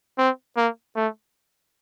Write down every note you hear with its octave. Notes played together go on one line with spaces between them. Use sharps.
C4
A#3
A3